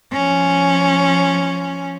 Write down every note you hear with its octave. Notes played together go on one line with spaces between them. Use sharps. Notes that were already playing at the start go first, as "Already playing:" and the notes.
F3 C#4